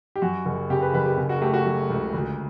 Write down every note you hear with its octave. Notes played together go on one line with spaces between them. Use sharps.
G4
F#2 F#4
F#1
C#3 G4
B4
F#1 B4
G4
C#3
F#4
A3 G4
F#4
F#3
C#2
D2